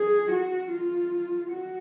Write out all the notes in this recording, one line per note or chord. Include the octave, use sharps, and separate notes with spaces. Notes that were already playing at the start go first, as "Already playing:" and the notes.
Already playing: G#4
F#4
F4
F#4